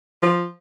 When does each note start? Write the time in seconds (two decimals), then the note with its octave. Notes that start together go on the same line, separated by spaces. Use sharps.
0.22 F3